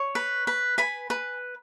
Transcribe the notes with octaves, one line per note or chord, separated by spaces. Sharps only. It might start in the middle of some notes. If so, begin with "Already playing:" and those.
Already playing: C#5
B4
B4
B4 G#5 B5
B4